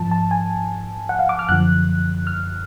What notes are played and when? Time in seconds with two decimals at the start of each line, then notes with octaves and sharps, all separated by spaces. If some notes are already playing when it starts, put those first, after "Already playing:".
Already playing: G#2 F3 A5
0.11 A5
0.31 G#5
1.09 F#5
1.19 F5
1.29 D6
1.39 F6
1.49 F#2 D3 F3 F#6
2.27 F6